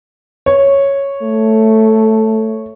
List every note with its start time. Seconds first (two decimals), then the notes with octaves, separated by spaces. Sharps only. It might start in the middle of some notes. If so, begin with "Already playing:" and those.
0.46 C#5
1.23 A3